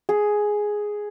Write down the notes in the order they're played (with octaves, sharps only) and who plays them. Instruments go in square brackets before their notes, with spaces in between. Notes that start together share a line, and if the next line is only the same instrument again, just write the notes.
[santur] G#4